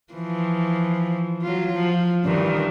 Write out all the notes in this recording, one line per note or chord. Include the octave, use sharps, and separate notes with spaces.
E3 F3
F#3 F4
F3
G2 D#3 E3